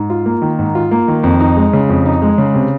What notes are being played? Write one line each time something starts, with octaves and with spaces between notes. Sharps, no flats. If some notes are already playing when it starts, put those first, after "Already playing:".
Already playing: G#2
F4
A#3
D#3
G#2
F4
A#3
D#3
F2
D#4
G#3
C#3
F2
D#4
G#3
C#3
C3